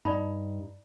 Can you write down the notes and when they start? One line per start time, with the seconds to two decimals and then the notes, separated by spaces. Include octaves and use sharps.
0.05 G2 D#4 D5 A5 B5